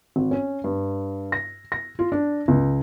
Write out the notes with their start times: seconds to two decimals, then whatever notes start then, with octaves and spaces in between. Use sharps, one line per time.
0.16 G#1
0.31 C#4
0.64 G2
1.32 A#6
1.72 A#6
1.99 F4
2.12 D4
2.48 C#2